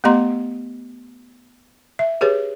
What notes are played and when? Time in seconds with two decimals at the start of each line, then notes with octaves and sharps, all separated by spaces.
0.04 A3 B3 G4 D#5 A#5 C6
1.99 E5
2.21 G4 G#4 B4 C#5